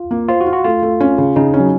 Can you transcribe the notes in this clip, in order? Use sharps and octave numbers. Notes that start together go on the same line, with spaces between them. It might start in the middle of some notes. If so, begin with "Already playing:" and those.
Already playing: F4
A#3
F4 C5
F#4
F4
F#4
A3 F4
A3
C#4
C#3
C#3 D#4
C#4
F#3